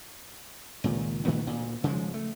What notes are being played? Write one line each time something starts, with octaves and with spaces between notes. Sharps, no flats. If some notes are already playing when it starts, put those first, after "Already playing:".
C#2 A#2 D#3
A#2 D#3 A3 B3
D2 A#2
C#3 F3 G#3
A3